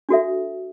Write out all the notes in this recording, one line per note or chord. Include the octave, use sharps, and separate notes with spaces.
D4 F#4 A4 E5